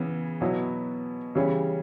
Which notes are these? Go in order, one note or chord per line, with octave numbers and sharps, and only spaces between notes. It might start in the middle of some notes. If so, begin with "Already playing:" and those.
Already playing: C#3 E3 B3
B2 F#3 B3 E4
C#3 E3 G3 C#4